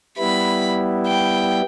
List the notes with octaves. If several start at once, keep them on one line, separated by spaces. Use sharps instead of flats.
G3 B3 E4 B5
G5